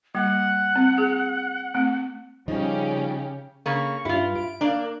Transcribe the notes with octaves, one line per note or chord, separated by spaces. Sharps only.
G3 A#3 F#5
C4
G#4
A3 C4
C#3 F3 G3 C#4 D#4 G4
C#3 A#3 C#6
G2 E4 F4
D7
A#3 D4 D5